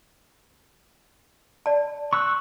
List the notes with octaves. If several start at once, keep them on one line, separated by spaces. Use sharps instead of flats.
D5 A5
C#6 E6 F#6